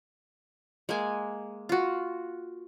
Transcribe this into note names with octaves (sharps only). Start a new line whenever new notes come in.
G#3 A#3 G#5
F4 F#4